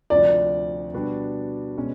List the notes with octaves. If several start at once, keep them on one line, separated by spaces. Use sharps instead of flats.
D2 C3 F3 D5
B2 G3 B3 D4 F#4
B2 G#3 C#4